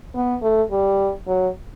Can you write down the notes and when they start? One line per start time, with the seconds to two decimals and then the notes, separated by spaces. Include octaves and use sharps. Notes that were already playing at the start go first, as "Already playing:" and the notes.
0.15 B3
0.42 A3
0.71 G3
1.27 F#3